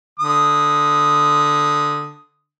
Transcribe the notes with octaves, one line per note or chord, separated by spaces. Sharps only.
D3 D#6